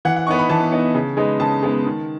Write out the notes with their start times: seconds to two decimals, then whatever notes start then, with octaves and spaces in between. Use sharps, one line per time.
0.05 E3 F#5
0.16 F#5
0.27 B3 D#4 C#6
0.39 B5
0.49 E3 A5
0.72 B3 D#4
0.95 C#3
1.17 G#3 B3 D#4
1.40 C#3 A5
1.63 G#3 B3 D#4
1.85 D#3